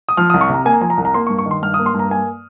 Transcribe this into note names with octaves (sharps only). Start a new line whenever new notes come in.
D#6
F3 F6
D#6
C2
C#6
C3 A#5
A#3 G#5
A#5
F3 G#5
A#5
C2
A#5
A#3 C6
C#6
G2
C#6
D#3
C6
G2 F6
D#6
A#3
C6
G2
A#5
A#3 G#5